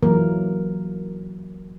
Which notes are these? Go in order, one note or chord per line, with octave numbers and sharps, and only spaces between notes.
E3 F#3 A#3 A#4